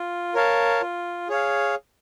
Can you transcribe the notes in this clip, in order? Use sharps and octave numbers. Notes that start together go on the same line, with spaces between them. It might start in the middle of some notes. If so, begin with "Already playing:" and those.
Already playing: F4
A#4 C#5 F5 A5
F4
G#4 C#5 F5